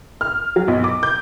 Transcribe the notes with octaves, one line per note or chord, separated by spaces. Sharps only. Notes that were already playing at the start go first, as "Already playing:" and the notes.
F6
F#3
B1
D6
G6